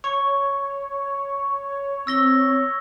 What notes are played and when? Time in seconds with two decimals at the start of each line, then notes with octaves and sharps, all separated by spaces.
0.04 C#5 C#6
2.07 C4 E6 A#6 G7